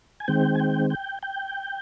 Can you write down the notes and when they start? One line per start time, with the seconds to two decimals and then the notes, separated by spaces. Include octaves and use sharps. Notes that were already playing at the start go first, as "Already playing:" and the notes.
0.20 G#5
0.28 D#3 G#3 C4 G5
0.55 G#5
0.60 G5
0.90 G5
1.23 G5